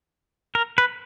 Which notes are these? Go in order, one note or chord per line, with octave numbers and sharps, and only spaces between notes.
A#4
B4